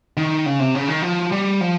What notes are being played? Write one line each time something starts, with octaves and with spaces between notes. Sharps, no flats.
D#3
C#3
C3
C#3
D#3
F3
G3
F3